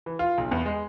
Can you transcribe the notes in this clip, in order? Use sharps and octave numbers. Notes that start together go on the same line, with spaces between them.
E3
F4
B1
E2
G#3